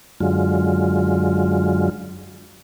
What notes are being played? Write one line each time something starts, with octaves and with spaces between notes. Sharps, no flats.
F#2 D3 F#3 G#3 F4